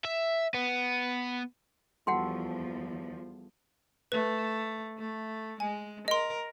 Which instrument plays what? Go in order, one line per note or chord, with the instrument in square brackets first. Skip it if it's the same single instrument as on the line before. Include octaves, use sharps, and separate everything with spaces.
[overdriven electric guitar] E5
B3
[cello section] E2 F3 [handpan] G3 F#4 A4 [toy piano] F#5 G5 C6
[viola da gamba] A3 [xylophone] B4
[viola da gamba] A3
[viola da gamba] G#3 [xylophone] G#5
[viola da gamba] A#4 [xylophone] D#5 C6